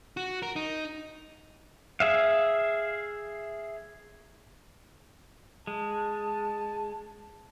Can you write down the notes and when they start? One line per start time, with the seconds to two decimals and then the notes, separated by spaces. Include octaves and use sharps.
0.17 F#4
0.42 A#4
0.56 D#4
2.00 G#4 E5 F5
5.67 G#3 A5